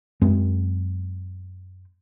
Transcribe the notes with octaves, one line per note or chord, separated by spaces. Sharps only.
F#2 G#3 C4